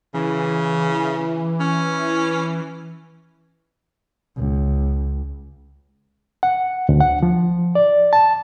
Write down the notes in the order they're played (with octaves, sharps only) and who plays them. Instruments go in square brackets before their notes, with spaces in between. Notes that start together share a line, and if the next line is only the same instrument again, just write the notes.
[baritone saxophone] C#3 [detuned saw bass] E3
[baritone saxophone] C#4
[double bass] C#2
[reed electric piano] F#5
D2
F#5
F3
D5
A5